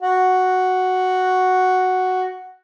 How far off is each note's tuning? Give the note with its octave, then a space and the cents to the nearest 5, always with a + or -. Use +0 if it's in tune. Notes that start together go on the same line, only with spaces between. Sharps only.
F#4 +0